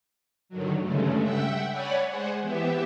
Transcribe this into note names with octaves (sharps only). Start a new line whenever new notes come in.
G2 D3 D#3 F#3
G2 C#3 G#3 A3
E5 F#5 G5 E6
C#5 D5 F#5 G#5 B5
G#3 G#4 C5 F#5
E3 B3 G4 E5